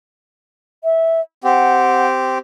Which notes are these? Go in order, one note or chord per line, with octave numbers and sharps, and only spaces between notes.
E5
C4 G4 F#5